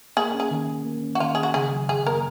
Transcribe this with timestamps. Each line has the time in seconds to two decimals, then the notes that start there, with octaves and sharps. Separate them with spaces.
0.17 A#3 G#4
0.34 C#4
0.40 G#4
0.51 D#3
0.69 D#3
0.85 A#3
1.02 C#4
1.15 F#4
1.20 D#3 F4
1.35 D#3 G#4
1.43 F#4
1.54 C#3 G#4
1.71 F#3
1.89 F#2 G#4
2.07 A#3 A#4